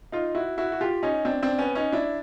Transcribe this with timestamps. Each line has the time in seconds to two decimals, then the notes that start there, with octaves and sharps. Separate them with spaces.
0.12 D#4 F4
0.35 E4 F#4
0.58 E4 F#4
0.72 F#4
0.81 F4 G4
1.03 C#4 D#4
1.25 C4 D4
1.42 C4 D4
1.58 B3 C#4
1.75 C#4 D#4
1.92 D4 E4